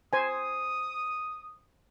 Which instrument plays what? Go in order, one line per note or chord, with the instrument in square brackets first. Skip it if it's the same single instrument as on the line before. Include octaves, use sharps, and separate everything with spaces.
[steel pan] C5 G#5 [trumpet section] D#6